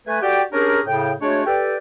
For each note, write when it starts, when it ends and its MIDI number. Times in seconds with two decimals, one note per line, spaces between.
0.07 0.21 57
0.07 0.21 71
0.07 0.21 80
0.22 0.41 66
0.22 0.41 67
0.22 0.41 69
0.22 0.41 74
0.22 0.41 79
0.53 0.80 61
0.53 0.80 62
0.53 0.80 67
0.53 0.80 68
0.53 0.80 70
0.87 1.12 45
0.87 1.12 49
0.87 1.12 79
1.22 1.44 56
1.22 1.44 57
1.22 1.44 62
1.22 1.44 66
1.22 1.44 73
1.46 1.77 67
1.46 1.77 69
1.46 1.77 71
1.46 1.77 74
1.46 1.77 79